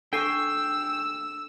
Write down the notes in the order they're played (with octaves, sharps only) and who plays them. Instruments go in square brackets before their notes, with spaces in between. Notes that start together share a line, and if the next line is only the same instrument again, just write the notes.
[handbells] D4 A4 C7 [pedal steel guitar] G5 G#5 C#6 [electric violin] E6